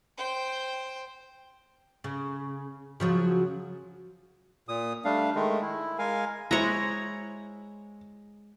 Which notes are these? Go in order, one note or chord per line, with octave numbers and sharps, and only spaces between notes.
C5 G5
C#3
C#3 F3 F#3
A#2 D#6
G3 A3 D4 F5
D#3 G#3 A3
E4
G#3 A#4 F5 G#5
G#3 E4 C5 C#5 A#5